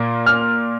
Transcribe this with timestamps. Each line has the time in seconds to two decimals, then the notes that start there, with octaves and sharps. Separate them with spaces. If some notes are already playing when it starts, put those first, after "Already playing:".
Already playing: A#2 A#3
0.26 F6